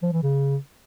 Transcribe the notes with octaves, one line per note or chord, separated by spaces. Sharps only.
F3
E3
C#3